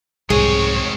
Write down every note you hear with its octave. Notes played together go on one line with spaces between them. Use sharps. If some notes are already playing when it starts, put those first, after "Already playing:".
C2 F2 G#2 G#3 C4 G#4 C#5